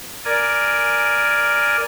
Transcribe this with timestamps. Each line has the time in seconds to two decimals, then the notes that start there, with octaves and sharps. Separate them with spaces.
0.25 A#4 D5 G#5